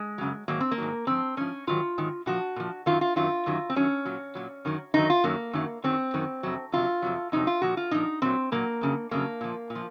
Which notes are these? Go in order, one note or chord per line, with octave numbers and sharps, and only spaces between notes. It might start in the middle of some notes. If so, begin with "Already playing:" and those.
Already playing: G#3
F#2 C#3 F#3
G#2 D#3 F#3 A#3
C4
A#3
G#2 D#3 F#3
G#2 F3 C4
G#2 F3 C#4
G#2 D#3 F#3 F4
G#2 D#3 F#3
A#2 F3 F#4
A#2 F3
F#2 D#3 F#3 F4
F4
F#2 D#3 F#3 F4
F#2 D#3 F#3
C4
F#2 D#3 F#3 C#4
A#2 F#3
A#2 F#3
F#2 D#3 F#3
F#2 D#3 F#3 D#4
F4
F#2 D#3 F#3 A#3
F#2 D#3 F#3
F#2 D#3 F#3 C4
F#2 D#3 F#3
F2 C3 F#3
F2 C3 F#3 F4
F2 C3 F#3
F2 C3 F#3 D#4
F4
A#2 F3 F#4
F4
A#2 F3 D#4
A#2 F#3 C4
A#2 F#3 A#3
F2 C#3 F#3
F2 C#3 F#3 A#3
A#2 F3
A#2
F3